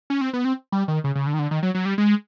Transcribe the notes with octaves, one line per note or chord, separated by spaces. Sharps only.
C#4
C4
B3
C4
G3
D#3
C#3
C#3
D3
D#3
D3
D#3
F#3
F#3
G3
G#3